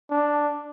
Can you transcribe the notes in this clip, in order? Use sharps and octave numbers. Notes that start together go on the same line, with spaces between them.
D4